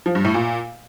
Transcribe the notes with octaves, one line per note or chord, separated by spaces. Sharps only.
F3
G2
A2
A#2